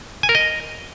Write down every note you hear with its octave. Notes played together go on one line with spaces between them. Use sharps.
G#5
A#4
D#5